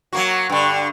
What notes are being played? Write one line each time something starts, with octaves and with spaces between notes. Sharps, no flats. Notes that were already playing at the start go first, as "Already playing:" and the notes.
F#3 A#3 F#4
G2 D3